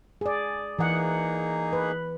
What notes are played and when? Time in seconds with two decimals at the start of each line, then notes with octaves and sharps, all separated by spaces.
0.21 G#4 D5
0.79 E3 A#3 D#4 G#4 F#5
1.73 B4